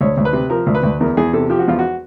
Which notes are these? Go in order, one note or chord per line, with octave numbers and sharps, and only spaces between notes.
D2 C#5
D2
B4
C3
F3 A#4
D2
B4
D2
E2 A#4
E2 G#4
C3 A4
F3 G4
F#4
E2 F4
F#4